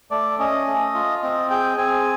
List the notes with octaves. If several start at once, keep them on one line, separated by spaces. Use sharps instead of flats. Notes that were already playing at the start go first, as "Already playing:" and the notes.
A3 D5
C#4 D#5
A3
F4
C4 D#5
G#4 G5
C4 G#5